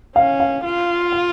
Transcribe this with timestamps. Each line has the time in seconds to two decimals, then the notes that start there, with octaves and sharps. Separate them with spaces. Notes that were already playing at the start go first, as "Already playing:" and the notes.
0.16 C#4 F5
0.40 F5
0.64 F4
1.12 F5